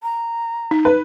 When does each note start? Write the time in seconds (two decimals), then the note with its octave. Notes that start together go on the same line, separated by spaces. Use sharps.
0.03 A#5
0.71 D#4
0.85 B4